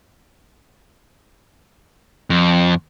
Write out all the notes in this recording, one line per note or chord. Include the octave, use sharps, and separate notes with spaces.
F2